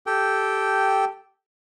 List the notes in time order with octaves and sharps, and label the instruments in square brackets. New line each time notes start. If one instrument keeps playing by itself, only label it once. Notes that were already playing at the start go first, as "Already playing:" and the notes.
[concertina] G4 A4 G5